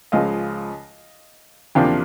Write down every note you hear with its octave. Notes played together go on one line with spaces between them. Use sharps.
C#2 C#3 F3 G#3 D#5 F5
E2 C3 F3 A#3 D4 F5 G5